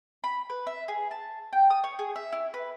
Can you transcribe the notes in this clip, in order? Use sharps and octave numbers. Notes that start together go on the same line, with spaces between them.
B5
B4
E5
G#4
A5
G5
D#6
C#5
G#4
E5
E4
B4